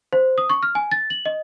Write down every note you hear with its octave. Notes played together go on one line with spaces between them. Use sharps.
C5
D#6
C#6
F6
G#5
A6
F#7
D#5